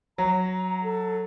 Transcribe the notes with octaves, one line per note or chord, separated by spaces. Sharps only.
F#3 A#5
A4